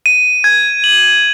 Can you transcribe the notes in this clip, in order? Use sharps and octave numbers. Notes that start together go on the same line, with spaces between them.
D#7
G#6
F#7